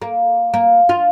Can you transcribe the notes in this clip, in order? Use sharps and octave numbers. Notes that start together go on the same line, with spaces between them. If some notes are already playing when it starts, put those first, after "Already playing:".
A#3
A#3
F4